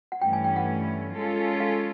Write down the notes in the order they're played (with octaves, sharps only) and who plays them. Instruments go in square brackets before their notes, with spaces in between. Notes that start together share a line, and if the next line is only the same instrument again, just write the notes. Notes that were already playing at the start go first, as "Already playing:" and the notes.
[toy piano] F#5
[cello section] G2 E3 A3 C#4 [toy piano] G5
[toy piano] G#5
G5
F#5
[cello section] G#3 C#4 F4 A4
[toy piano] F5